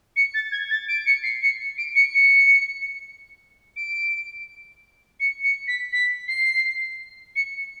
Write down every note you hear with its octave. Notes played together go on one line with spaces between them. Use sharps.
C#7
A6
G#6
A6
D7
C#7
C7
C#7
D7
C#7
C#7
D7
C#7
C#7
B6
B6
C7
C#7